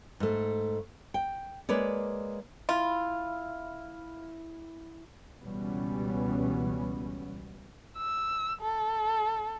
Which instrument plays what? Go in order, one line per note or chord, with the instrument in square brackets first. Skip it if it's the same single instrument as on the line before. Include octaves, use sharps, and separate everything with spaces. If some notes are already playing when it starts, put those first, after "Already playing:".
[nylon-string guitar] G#2 A3
G5
G#3 A#3 B4 C#5 D5
[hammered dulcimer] E4 [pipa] F4
[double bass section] C#2 B2 E3 G3 B3 C#4
[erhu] E6
A4